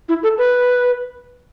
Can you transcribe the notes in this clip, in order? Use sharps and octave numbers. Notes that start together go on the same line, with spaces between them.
E4
A4
B4